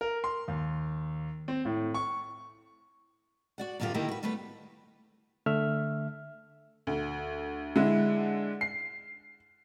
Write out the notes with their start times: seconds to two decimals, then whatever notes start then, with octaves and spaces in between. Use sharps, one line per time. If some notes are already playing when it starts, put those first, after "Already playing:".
0.01 A#4
0.24 C6
0.48 D#2
1.48 C4
1.65 A2
1.94 C#6
3.58 F#4 D5 F#5
3.80 F#2 B2 D3 B3 F4 G4
3.94 D3 D#3 A#3 E4 G4 A#4
4.08 F#4 B4
4.23 G3 A3 B3 B4
5.46 D3 A3 E5 F6
6.87 D2
7.76 D3 G#3 E4
8.61 C7